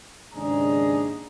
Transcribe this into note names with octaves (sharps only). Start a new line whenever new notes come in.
D#2 G#2 C#3 D4 G#4 A#5